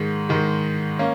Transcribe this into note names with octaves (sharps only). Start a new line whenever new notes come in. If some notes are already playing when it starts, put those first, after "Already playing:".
Already playing: G#2 D#3 G#3
G#2 D#3 G#3
A#3 C#4